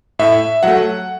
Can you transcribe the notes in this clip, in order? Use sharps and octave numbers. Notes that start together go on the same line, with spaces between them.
A2 E5
F#3 A3 F#5